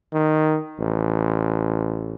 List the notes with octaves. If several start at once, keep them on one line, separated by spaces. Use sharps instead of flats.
D#3
A1